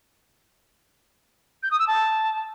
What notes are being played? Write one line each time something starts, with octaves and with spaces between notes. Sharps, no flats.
G6
D#6
E6
A5